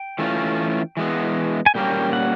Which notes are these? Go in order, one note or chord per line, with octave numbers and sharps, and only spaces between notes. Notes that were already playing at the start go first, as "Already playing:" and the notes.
Already playing: G5
E3 A3 C#4 F4
E3 G#3 B3
G#5
A#2 G3 A#3 C#4 G5
F#5